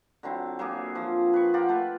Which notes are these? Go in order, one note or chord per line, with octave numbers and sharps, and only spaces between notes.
D3 F#3 C4 E4
F#3 A#3 G4 G#4
F3
B4 C#6
F4 G4 A#4 F#5
A3 B4